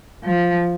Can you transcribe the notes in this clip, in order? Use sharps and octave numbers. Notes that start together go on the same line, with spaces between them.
F3